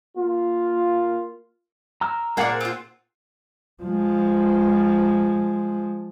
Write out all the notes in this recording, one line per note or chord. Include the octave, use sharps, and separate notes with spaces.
A#3 F4
A#5 E6 F6
A#2 G#3 G#4 A#4 D5 F#5 D6
C5
C4 F4
F3 G#3